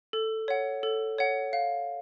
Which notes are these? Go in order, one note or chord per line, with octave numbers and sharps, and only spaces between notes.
A4
C#5 F#5
A4
C#5 F#5
F5